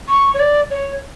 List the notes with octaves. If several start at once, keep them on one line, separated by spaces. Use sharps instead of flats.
C#6
C#5
D5
C#5